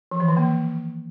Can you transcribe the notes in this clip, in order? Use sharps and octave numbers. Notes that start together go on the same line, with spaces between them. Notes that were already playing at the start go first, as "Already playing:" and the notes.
F3
E3
D#3
A#3